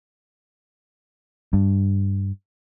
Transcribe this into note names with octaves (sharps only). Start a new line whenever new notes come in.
G2